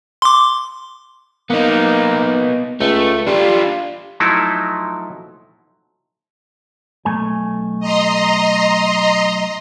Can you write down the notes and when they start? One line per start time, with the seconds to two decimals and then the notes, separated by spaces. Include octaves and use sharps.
0.22 C6 D6
1.50 A#3 B3 D#4
2.80 C#2 A3
3.27 G3 D4 F4
4.20 F3 F#3 A3 D#4 E4
7.05 B1 A3 G#5
7.80 D#5 A#5 C6